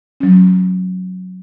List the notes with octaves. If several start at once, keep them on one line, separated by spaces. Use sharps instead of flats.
F#3 C#4